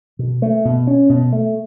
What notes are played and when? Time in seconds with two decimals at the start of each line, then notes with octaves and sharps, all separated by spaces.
0.19 B2
0.42 A3
0.65 B2
0.87 C#4
1.09 B2
1.32 A3